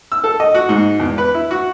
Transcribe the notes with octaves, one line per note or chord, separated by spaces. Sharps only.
E6
A4
D#5
F#4
G#2
E2
B4
E4
F#4